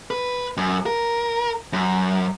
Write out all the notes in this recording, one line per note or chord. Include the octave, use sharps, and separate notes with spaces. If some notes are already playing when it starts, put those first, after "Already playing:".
B4
F#2
A#4
F#2